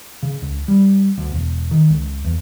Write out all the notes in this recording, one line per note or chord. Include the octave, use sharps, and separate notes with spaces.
C#3
C#2
G3
D2
E1
D#3
C#2
E2